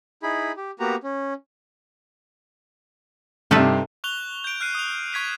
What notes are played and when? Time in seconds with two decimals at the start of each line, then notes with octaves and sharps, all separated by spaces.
0.23 D#4 E4 G#4 B5
0.57 G4
0.80 A#3 B3 F#4 G4 A#5
1.04 C#4
3.51 G2 C3 D#4 A4 B4
4.04 C#6 F#6 F7 G7
4.44 G6 D7
4.61 F6 F#6 C7 D#7
4.75 D#6 F7
5.13 C#6 G#6 B6 D#7